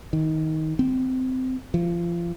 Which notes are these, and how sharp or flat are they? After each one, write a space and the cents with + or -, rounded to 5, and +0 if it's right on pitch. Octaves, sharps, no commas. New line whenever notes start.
D#3 +15
C4 -20
F3 -30